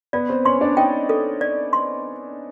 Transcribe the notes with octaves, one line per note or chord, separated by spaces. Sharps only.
B3 B4 D5
C4 C5
C#4 C#5 C6
D4 D5
D#4 D#5 G5
A4
D5
C6